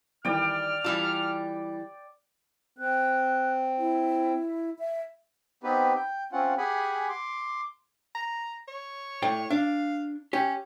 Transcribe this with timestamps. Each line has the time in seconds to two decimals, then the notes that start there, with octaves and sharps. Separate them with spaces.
0.25 D#3 E3 G3 D5 G5 F6
0.84 E3 G3 F4 A5 D6 E6
2.78 C4 F#6
3.78 E4
4.79 E5
5.63 B3 C4 D#4 G4 B4
5.96 G5
6.33 C4 C#4 F4 F#5
6.58 G4 G#4 F#5 G#5 B5
7.09 C6 D6
8.15 A#5
8.68 C#5
9.22 A2 D5 G5
9.50 D4 F5
10.33 C#4 G4